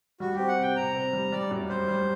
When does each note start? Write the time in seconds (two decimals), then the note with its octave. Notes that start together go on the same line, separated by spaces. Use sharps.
0.20 G3 F#4
0.35 C4 G4
0.48 F#5
0.58 C3 G5
0.76 C3 A#5
0.95 C4
1.13 G3
1.32 G3 D5
1.51 F#2
1.69 G3 C5
1.88 G3